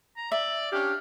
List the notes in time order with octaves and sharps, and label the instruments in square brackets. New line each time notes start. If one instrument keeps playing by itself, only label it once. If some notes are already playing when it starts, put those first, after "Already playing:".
[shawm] A#5
[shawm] D5 [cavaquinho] E5
[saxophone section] C#4 D4 G4 [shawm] F5